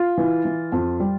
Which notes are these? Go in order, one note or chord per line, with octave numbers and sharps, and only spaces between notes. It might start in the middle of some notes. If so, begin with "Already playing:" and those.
Already playing: F4
E3
E3
F2
G3